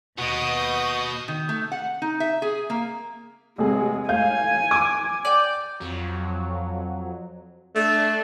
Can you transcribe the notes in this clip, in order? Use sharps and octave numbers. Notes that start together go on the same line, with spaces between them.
D#2 B2 F#4 D#5 D#6 G6
D#3
A3
F#5
D#4
E5
G#4
A#3
A1 C3 G#3 G#4
A2 F5 G#5 G6
D6
D5 G5
F2 F#3
A3 D4